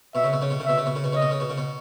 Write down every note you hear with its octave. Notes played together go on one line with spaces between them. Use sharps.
B2 E5
C#3
B2
C#3
B2
C#3
B2 E5
C#3
B2
C#3
B2
C#3 D#5
B2
C#3
B2
C#3
B2